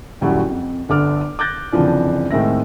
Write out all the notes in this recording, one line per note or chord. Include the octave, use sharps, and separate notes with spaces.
D#1 F#2 G3 E4 F#4
F2
G1 D3 A4 D6 F6
D6 F#6 G6 A6 A#6
F#1 F2 D3 E3 F3 D4
A2 D#3 G#3 C4 E5 A#6